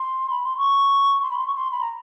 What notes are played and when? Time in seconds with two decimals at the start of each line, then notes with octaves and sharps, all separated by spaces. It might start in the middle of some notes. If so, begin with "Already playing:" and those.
Already playing: C6
0.30 B5
0.44 C6
0.57 C#6
1.23 C6
1.31 B5
1.39 C6
1.47 C#6
1.55 C6
1.71 B5
1.81 A#5